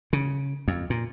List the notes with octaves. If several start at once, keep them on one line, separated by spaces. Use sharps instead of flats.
C#3
F2
A#2